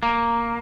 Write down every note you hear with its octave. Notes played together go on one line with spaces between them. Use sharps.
A#3